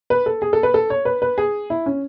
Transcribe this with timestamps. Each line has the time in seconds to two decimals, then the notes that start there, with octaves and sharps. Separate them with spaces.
0.10 B4
0.26 A4
0.42 G#4
0.53 A4
0.63 B4
0.74 A4
0.90 C#5
1.05 B4
1.22 B4
1.38 G#4
1.70 E4
1.86 C#4